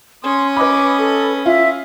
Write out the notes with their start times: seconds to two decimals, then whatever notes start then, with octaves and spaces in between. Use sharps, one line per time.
0.24 C#4 C6 D#6
0.56 B4 D#5 B5 D6
0.98 A4
1.46 F4 E5